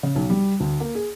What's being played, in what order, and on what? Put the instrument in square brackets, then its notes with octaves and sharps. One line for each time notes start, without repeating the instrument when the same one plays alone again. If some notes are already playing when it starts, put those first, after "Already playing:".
[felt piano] C#3
B1
G3
D2
A#3
G#4